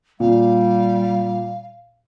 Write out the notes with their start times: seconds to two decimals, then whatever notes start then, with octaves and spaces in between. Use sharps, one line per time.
0.20 A#2 G3 F5